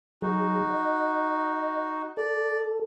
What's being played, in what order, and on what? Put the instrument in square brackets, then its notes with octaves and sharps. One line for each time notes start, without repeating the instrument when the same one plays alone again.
[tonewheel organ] F#3 G#4 [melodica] D#4 F#4
[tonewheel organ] D#5
[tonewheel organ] A4 [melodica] D5